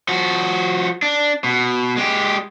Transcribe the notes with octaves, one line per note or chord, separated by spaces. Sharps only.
F3 F#4
D4
B2
G#3 G4